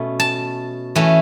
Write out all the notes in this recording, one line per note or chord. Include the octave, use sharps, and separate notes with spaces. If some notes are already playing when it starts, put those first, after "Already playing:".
Already playing: B2 A3 C#4
A5
E3 A3 C#4